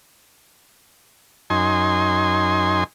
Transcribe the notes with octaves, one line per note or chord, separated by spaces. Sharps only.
F#2 D#4 G#5 C6